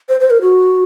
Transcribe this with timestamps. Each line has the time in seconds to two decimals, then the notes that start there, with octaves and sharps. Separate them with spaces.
0.09 C5
0.20 C5
0.30 A#4
0.42 F#4